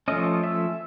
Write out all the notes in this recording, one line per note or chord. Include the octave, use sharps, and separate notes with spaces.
F3 A3 C#4 D#5
E5